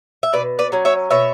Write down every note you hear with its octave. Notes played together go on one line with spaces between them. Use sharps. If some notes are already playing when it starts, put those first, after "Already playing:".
E5
B2 B4 D5
B4 D5
F#3 C#4
C#5 E5
B2 C#5 E5